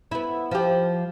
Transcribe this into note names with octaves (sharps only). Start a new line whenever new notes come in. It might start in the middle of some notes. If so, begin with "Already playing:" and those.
B3 E4
F3 G4